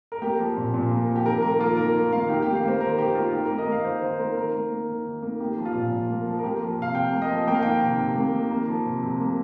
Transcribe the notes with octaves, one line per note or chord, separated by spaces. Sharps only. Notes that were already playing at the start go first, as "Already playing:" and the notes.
A#4
A#3 G4
F3
A#2
A#2
A#3
F3
G4
D#3 A#4
A#3 A#4
A#3 F4
D#3 A#4
D#3
A#3 F5
D#3 G4
G4
A#3
F5
A#3 C5
D#3 A#4
D#3 G4
A#3 F4
D#3 G4
A#4
A#3
D#5
A#3
F5
D#3 C5
D#3 C5
A#3 A#4
D#3 A#4
A#3
A#3
D#3
D#3
A#3
A#3 G4
F3
F4
A#2
A#2
A#3
F3
A#4
A#3 G4
F3
C3 F5
C3 G5
A#3
D#5
F3
A#3 G5
F5
D#3 G5
C3
C3
A#3
D#3
A#3
F3
C3
C3
A#3